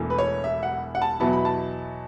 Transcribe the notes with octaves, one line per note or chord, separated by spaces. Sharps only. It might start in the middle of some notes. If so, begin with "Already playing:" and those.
Already playing: E1 E2 E3 A3
B4
C#5
E5
F#5
F#5
A5
E2 B2 F#3 B3 E4 A5
B5
A5